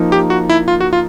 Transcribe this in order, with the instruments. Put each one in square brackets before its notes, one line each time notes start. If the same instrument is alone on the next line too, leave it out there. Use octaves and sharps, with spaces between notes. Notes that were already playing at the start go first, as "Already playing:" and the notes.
Already playing: [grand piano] F3 A#3 D#4
[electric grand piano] G4
F#4
E4
F4
F#4
F4